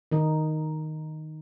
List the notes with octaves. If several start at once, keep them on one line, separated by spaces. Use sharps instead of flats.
D#3 D#4